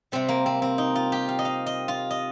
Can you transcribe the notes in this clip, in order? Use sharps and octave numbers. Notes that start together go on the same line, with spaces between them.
C3 G3 C4
A#3
C4
C4
D#4
F4
G4
F5
D#5
F5
D#5
F4
D#5